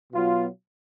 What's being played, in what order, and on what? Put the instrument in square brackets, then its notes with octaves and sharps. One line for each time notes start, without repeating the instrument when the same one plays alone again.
[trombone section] B2 F#3 B3 F4